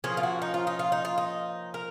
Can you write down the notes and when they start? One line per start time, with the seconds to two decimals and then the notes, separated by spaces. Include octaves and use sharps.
0.04 F3 A#3 C#4 G#4
0.17 F4
0.23 F#4
0.42 D#4
0.54 F4
0.67 D#4
0.79 F4
0.92 D#4
1.05 F4
1.18 D#4
1.74 A#4